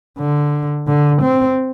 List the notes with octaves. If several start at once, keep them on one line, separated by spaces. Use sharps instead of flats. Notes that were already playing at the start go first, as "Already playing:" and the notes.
D3
D3
C4